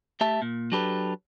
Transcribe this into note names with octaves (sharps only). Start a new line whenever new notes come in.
A3 G4 E5 A5
A#2
F#3 D4 G4 A4 B4